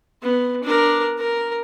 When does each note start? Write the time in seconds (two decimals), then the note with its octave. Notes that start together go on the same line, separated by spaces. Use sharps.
0.23 B3
0.63 D4 A#4
1.18 A#4